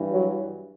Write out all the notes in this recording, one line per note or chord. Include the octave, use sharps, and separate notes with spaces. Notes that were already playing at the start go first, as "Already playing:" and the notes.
Already playing: G2 E3
F#3